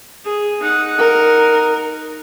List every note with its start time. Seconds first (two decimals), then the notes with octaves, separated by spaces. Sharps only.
0.25 G#4
0.63 D#4 F#5
0.99 A#4